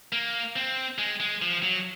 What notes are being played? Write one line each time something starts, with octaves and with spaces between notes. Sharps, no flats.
A#3
C4
G#3
G#3
F3
F#3